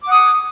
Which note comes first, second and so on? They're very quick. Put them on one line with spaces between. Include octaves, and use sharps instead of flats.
D6 F#5 D#6